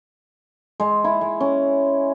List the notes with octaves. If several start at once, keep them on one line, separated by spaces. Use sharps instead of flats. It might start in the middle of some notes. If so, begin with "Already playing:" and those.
G#3
E4
G#3
C#4